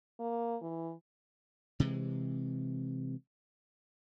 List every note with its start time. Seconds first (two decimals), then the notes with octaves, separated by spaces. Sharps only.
0.20 A#3
0.62 E3
1.80 C3 E3 G#3